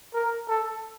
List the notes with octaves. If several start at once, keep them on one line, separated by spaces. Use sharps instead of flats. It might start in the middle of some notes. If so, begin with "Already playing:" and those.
A#4
A4